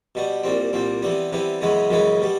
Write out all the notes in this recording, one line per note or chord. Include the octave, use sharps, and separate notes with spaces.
B2 G3 B3
C2 A#2 G3 C4
C2 A#2 G3 C4
C3 E3 G3 B3
C3 E3 G3 B3
F#2 C#3 E3 G#3 B3
F#2 C#3 E3 G#3 B3
B2 G3 B3